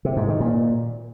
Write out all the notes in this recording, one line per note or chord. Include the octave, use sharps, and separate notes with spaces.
C3
G#2
D#3
A#2